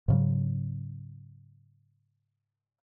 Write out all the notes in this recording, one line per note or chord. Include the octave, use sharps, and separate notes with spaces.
G#2 C#3 F#3